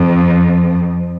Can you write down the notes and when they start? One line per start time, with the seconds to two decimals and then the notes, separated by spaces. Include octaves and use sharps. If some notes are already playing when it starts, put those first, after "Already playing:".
Already playing: F2